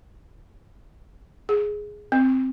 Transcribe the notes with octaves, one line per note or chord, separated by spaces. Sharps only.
G#4
C4